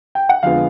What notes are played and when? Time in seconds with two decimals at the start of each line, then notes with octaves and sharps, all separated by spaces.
0.15 G5
0.29 F#5
0.43 F2 D3 F3 G#3 B3 F5